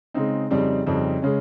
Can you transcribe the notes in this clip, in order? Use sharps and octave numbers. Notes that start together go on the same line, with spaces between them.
C#3 G#3 C4 D#4
F2 C#3 G3 C4 D#4
F2 C#3 G3 C4 D#4
C#3 G#3 C#4